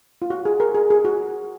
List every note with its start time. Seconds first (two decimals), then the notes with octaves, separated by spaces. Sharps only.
0.22 F4
0.30 F#4
0.45 G#4
0.60 A#4
0.75 G#4
0.90 G#4
1.05 F#4